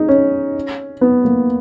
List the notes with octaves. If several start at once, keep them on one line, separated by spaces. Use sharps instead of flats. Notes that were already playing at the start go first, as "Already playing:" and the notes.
Already playing: D#4 G#4
C#4
B3
A#3